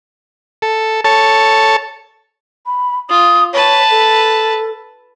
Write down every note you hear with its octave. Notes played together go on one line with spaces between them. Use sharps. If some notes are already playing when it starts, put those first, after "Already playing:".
A4
A4 C#5 A5
B5
F4 D#6
B4 C#5 A5
A4